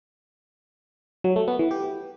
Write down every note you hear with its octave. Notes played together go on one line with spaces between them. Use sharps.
F#3
A3
B3
E3
G4